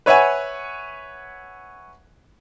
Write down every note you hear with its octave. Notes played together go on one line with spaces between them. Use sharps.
B4 C#5 E5 F#5 G#5